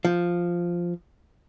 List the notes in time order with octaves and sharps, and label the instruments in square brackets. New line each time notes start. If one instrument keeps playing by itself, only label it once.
[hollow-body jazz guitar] F3